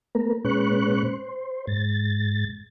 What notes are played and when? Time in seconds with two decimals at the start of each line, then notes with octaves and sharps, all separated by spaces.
0.15 A3 B3 A#4
0.45 A#2 G#3 C#4 B4 C#6 F#6
1.04 C5
1.67 G#2 A6